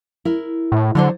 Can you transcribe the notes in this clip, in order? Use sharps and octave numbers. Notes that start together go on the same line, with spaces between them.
E4 A#4
A2
D3 F#3 D4 C5